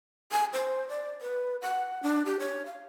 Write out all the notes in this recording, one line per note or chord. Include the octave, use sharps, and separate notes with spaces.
G#5
C5
D5
B4
F#5
D4
G4
C#5
F5